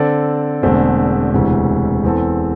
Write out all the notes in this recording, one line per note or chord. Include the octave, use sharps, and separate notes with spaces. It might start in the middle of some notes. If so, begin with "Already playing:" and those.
Already playing: D3 C4 A4 D5
E1 E2 D3 A3 C4
E1 D2 C3 E3
E2 E3 C4 A4